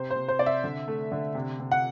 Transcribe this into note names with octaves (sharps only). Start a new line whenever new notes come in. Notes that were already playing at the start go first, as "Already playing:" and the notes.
Already playing: C3 C5
C5
C3
C5
C3 D5
E5
D3
A3
D3
C3
C3
F#5